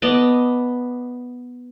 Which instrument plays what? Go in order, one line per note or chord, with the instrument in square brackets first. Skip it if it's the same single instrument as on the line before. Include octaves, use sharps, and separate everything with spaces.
[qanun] B3 D5 D#5 A5